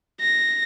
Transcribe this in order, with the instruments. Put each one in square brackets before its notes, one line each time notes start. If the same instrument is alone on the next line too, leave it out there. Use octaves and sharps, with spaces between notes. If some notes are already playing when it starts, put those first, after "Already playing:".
[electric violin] A#6